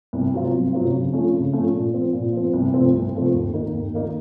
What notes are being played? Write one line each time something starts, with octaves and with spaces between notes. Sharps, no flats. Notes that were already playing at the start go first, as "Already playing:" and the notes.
C2
C3 F#3 C4 F4
C2
C3 F#3 C4 F4
C#3
F3 A3 C#4 F4
C#3
F3 A3 C#4 F4
A#2
F3 C4
A#2
F3 C4
C2
C3 F3 A3 C4
C2
C3 F3 A3 C4
D#2
D#3 A#3 D#4
D#2
D#3 A#3 D#4